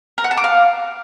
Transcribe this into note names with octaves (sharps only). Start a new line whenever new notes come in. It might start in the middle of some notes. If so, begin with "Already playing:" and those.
A#4
F#5
A5
D6
F5